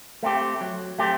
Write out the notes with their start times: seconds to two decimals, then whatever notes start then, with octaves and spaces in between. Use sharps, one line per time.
0.23 A3 C4 G4
0.61 F#3
0.99 A3 C4 G4